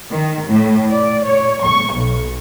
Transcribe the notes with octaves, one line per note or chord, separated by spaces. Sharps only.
D#3
A2
D5
C#5
C#6
B1